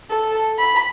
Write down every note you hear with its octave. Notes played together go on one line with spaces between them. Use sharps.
A4
B5